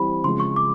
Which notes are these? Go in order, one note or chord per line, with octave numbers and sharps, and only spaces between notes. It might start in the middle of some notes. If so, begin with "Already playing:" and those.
Already playing: E3 G3 C4 B5
C#3 F3 G#3 C6
C#6
D6